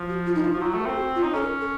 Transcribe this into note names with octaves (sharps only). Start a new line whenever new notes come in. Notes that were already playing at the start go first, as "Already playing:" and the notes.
Already playing: F3
F#4
F4
D#4
F4
F3 F#4
F#3 F4
A3 F#4
A#4
C4 A4
F#4
F4
D#4
C#4 A4
A#4
A4